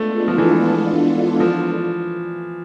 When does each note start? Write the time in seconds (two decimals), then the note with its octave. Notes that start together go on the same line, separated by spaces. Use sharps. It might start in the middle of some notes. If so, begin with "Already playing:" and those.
Already playing: G#3 A3 B3 D4 F4 A4
0.28 F3
0.38 E3
1.40 F3